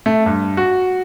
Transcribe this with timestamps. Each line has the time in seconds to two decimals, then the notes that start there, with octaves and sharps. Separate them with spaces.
0.06 A3
0.26 G2
0.57 F#4